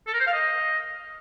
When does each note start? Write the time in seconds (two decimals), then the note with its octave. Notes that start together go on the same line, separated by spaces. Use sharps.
0.07 A4
0.13 A#4
0.20 C5
0.27 F5
0.33 D#5